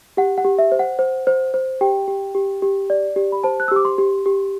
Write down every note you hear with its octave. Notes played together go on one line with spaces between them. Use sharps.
G4 F#5
F#5
G4
E5
C5
F#5
C5
C5
C5
G4 G5
G4
G4
G4
D5
G4
B5
C5 A5
F#6
E6
G4 D6
C6
G4
G4